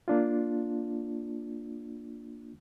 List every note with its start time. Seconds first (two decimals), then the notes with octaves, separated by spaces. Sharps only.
0.08 A#3 D4 F4